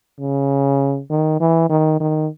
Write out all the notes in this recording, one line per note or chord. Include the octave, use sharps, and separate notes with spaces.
C#3
D#3
E3
D#3
D#3